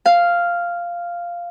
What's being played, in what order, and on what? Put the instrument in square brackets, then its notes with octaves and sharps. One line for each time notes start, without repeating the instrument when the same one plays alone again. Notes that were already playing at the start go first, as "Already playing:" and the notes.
[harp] F5